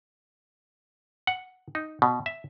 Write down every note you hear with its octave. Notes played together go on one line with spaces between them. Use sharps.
F#5
D#4
B2
E5